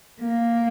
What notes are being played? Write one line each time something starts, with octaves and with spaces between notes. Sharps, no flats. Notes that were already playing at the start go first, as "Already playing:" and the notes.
A#3